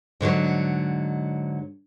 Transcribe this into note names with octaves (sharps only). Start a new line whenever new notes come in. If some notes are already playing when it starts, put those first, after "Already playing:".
G#2 D3 E3 F#3